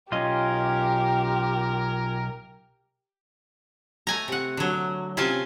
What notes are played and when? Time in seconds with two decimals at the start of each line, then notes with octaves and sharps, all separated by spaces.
0.12 B1 C#4 F4 G4 A#4 D#5
4.07 A3 G#5 A#5
4.28 C3 F#5
4.57 D3 F#3
5.17 C3 C#4 F4 G#5 A5